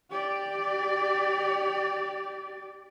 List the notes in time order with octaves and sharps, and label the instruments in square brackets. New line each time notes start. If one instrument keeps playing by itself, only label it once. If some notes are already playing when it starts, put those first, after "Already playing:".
[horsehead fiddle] G4 D5